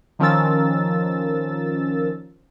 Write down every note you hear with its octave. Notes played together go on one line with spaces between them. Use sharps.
D#3 F3 C#4 A#4 E6 A6